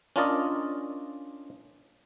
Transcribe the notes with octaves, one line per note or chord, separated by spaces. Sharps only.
C#4 D4 F4 A#4 D5 D#5